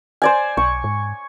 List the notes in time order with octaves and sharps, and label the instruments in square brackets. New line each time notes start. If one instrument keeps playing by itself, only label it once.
[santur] C5 D5 G#5
[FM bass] B1 [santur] C#6
[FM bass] G#2